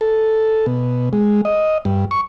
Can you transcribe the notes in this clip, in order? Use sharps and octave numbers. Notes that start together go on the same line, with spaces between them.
A4
B2
G#3
D#5
G2
C#6